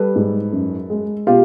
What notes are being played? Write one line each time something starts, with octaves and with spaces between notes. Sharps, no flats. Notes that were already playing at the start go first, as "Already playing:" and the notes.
Already playing: G3 A4 B4
G#2
F#2
G#3
B2 F4 G4